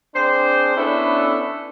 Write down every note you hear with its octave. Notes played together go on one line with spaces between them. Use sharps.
C4 D4 G#4 C5
B3 C#4 D4 E4 A4 B4